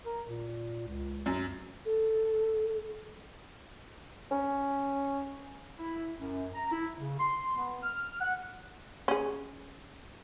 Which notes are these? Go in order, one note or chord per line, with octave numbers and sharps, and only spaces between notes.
A#4
A#2
C#2
F#2
A4
C#4
E4
F#2
A#5
E4
C#3
C6
B3
F6
F#5
C#4 G#4